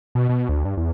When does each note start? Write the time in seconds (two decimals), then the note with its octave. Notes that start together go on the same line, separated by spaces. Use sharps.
0.15 B2
0.29 B2
0.49 D2
0.65 G2
0.77 E2